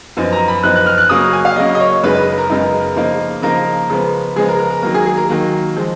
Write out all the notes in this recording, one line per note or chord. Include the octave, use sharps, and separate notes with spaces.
F#2 F3 B3 D#4
A#5
B5
F#2 F3 B3 D#4 F#6
F#6
F6
F#6
C#3 F#3 A#3 C#4 D#6
G#5
F5
C#3 F#3 A#3 C#4 D#5
D#5
C#5
F#2 C#3 G#3 B3 D#4 B4
B4
A#4
F#2 C#3 G#3 B3 D#4
C#3 F3 A#3 D#4
C#3 F3 A#3 D#4 A#4
C#3 F3 G#3 B3
C#3 F3 G#3 B3 G#4
A#4
A#4
A#4
D#3 F#3 A#3 A#4
G#4
G#4
A#4
D#3 F#3 A#3
F3 G#3